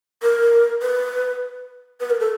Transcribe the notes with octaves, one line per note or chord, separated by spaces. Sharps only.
A#4
B4
B4
A#4
A4